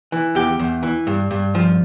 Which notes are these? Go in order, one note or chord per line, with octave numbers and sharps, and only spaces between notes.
E3
E2 G4
E2
E3
G2
G2
F3